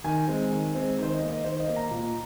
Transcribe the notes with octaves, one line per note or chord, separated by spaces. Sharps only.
D#3 G#5
G#3 C4
D#3
G#3 C4
D#3 C5
D#5
A#3
D#5
D#3 C5
D#5
A#3
A#5
A#2